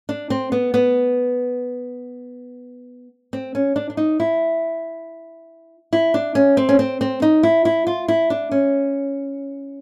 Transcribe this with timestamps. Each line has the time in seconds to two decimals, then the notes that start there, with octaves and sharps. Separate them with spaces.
0.09 D4
0.30 C4
0.52 B3
0.74 B3
3.33 C4
3.55 C#4
3.76 D4
3.90 D4
3.97 D#4
4.20 E4
5.93 E4
6.14 D4
6.35 C#4
6.57 C4
6.69 C#4
6.79 C4
7.01 C4
7.22 D#4
7.43 E4
7.65 E4
7.87 F4
8.08 E4
8.30 D4
8.51 C#4